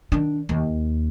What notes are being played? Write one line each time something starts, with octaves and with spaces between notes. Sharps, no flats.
D#3 D4
D#2